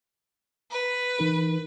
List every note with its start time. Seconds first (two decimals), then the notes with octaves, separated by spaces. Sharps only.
0.71 B4
1.19 E3 D#4 A#4